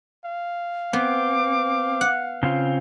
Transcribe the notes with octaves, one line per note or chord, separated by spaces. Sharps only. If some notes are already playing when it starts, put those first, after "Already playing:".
F5
B3 C4 D6
F#5
C#3 C4 F4